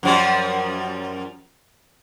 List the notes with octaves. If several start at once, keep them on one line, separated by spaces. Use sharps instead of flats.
F#2 F3 G3